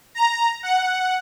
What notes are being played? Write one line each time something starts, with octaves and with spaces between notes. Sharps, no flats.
A#5
F#5